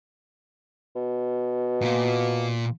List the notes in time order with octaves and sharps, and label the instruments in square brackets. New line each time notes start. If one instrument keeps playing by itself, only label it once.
[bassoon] B2
[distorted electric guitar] A#2 F4